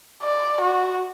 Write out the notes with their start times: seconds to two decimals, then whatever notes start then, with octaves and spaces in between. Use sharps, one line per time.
0.23 D5
0.61 F#4